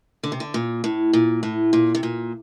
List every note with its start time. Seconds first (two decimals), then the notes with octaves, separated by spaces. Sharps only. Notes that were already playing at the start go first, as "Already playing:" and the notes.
0.23 D3
0.32 C3
0.40 D3
0.54 A#2
0.84 A2
1.13 A#2
1.43 A2
1.73 A#2
1.95 C3
2.03 A#2